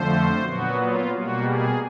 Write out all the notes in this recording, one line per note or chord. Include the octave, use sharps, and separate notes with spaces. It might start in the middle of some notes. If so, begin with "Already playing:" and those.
Already playing: F2 D3 F3 A3 C5
A#2 F#3 B3 F#4
F4
B2 G3 A#3 F#4
G#4